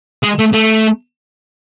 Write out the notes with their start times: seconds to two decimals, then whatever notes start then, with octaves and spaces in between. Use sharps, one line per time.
0.23 G#3
0.39 A3
0.53 A3